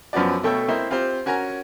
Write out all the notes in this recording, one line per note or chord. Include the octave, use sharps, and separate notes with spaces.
F#2 F3 B3 C#4 F#4 D5
B2 A3 A4 C#5 E5 G5
A#3 C4 E4 C5 D#5
C4 F4 G4 C5
C#4 F#4 A#4 G#5 A#5